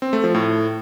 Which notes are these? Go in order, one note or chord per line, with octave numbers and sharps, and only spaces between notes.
C4
A3
F3
A2